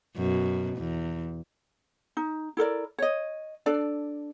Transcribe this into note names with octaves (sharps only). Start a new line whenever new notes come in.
F#2 B2
E2
D#4
E4 A4 A#4 D5
C#5 D#5
D4 A4 D5